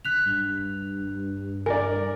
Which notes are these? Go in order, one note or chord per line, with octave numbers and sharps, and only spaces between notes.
F#6 B6 F7
G2
A#4 D5 G#5